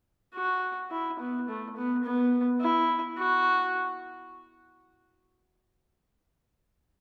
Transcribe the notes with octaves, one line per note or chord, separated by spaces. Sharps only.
F#4
E4
B3
A3
B3
B3
E4
F#4